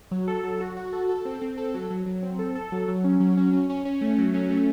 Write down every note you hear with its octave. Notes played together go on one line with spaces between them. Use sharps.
F#3
A4
F#3
F#4
F#4
A4
A4
C4
C4
A4
F#3
F#3
F#3
C4
A4
A4
F#3
F#3
C#4
F#3
C#4
C#4
C#4
C#4
A3
F#3
C#4
A3